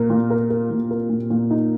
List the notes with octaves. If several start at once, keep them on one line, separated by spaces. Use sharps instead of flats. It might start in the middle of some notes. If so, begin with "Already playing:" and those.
Already playing: A#2 A#4
A#2
A#4
A#4
A#2
A#4
A#2
A#2
D#4